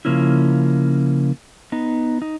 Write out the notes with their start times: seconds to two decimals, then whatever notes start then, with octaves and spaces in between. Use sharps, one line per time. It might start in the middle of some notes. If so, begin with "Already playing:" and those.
0.05 C#3 F3 A#3 C#4 E4
1.72 B3 D#4
2.22 D#4